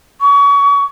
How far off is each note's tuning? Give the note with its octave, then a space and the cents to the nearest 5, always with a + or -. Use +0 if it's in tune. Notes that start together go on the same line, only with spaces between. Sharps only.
C#6 +35